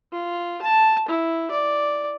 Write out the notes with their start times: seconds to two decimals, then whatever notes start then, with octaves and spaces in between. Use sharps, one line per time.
0.12 F4
0.62 A5
1.08 E4
1.51 D5